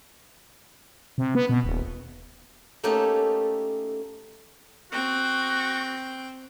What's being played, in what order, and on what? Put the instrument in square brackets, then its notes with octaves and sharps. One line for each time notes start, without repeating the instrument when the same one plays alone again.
[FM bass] C3
B3
B2
D#1
[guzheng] A3 A#3 C#4 D#4 G4 A4
[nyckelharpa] C4 G5 [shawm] F#4